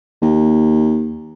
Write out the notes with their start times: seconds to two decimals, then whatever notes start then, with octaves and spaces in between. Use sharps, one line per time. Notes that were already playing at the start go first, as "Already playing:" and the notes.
0.22 D#2